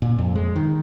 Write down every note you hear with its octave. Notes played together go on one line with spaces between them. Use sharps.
A#2
F2
G#3
D#3